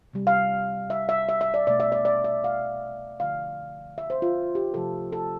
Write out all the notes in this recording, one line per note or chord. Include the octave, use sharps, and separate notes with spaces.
C3 G3
F5
E5
E5
E5
E5
D5
B2 A3 D5
E5
D5
D5
E5
F5
D3 F3 A3 F5
E5
C5
F4
G4
C3 F3 A3 A4
A4